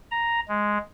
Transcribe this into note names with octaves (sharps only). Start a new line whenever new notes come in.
A#5
G#3